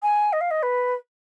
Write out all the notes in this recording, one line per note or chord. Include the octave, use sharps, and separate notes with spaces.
G#5
D#5
F5
D#5
B4